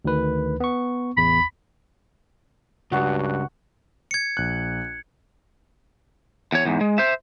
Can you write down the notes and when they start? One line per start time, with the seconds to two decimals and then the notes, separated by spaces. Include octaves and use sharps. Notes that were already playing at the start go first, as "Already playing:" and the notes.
0.05 D2 D#3 B4
0.60 B3 C#6
1.17 A1 E2 B5
2.92 C#2 G2 F#4 F#5
4.11 G#6 C#7
4.37 A#1 F#6
6.52 E2 C#5
6.65 E2 G#2
6.81 G#3
6.98 C5 E5